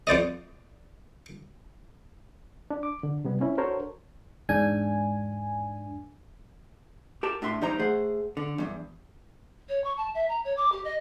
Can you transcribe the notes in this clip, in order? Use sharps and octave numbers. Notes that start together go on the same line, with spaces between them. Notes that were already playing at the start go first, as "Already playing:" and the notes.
F2 C5 D5 D#5
D4
D6
D3
C3 G3 B3
C4 C#4 E4
D4 F#4 A4 A#4 C5 C#5
E2 G#2 D4 G#5
G4 A#4 A5
A2 D4 E5 C6
E2 G3 D#4 C5 A#5
A3 G#4 C5 F#5
D3
E2 G2
C#5
C#6
A5
E5
A#5
C#5
D6
G4
D#5